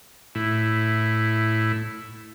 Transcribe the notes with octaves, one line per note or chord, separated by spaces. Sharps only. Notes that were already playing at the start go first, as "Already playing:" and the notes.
A2 E4